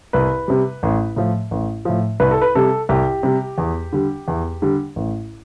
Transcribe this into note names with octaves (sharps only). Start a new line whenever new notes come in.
C2 B4
C3 G3
A1
A2 F3
A1
A2 F3
C2 B4
A4
B4
C3 G3 A4
C2 G4
C3 G3
E2
D3 G3
E2
D3 G3
A1